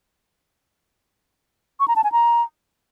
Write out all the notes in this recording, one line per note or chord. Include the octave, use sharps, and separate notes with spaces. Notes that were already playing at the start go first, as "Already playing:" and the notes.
C#6
A#5
A5
G#5
A#5